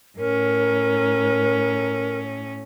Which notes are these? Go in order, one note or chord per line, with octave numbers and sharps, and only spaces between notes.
A2 C#4 A#4